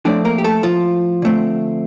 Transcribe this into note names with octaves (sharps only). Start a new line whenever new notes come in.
A2 F3 A3 C4 D4 D5
A#3 A#4
G4
A3 A4
F3 F4
D3 A3 C4